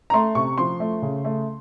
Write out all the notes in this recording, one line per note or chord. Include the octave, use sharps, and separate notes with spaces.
A#5
A3 C6
C3 C#6
F3 C6
A3
C#3
A3